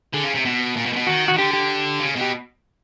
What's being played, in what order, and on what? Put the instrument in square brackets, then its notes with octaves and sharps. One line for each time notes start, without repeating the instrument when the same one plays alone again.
[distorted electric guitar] D3 [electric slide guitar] G#4
[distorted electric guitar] C#3
C3
B2
A#2
B2
A#2
B2
[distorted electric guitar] D#3 [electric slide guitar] F#4
[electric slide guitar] F#4
[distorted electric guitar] D#3
[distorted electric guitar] D3 [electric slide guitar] G4
[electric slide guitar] G4
[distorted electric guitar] C#3
B2
[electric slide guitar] G4